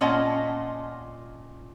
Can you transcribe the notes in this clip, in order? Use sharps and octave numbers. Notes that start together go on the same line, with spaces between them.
A#2 C#4 F4 D#5 F#5 A5